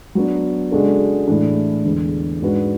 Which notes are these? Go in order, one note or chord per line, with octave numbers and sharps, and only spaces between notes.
F#3 B3 D4
C#3 G#3 D4 F#4 A4
A2 E3 G#3 D4
E2 D3 G#3
G#2 G#3 D4 F#4 B4